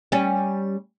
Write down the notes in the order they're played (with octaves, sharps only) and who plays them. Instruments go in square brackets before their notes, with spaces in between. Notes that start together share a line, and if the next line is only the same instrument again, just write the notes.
[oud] G3 C#4